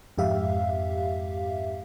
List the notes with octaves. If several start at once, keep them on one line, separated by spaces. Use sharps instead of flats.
F2 G#2 G4 E5 F5